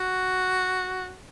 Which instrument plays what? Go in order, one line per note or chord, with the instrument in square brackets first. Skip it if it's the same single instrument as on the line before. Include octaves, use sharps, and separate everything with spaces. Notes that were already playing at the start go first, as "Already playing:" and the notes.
Already playing: [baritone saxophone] F#4